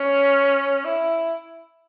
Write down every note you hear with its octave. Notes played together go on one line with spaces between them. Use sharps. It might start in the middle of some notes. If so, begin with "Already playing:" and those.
Already playing: C#4
E4